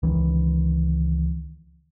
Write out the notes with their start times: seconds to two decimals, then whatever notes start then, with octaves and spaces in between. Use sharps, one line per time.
0.03 C#2 D#3 E3 C#4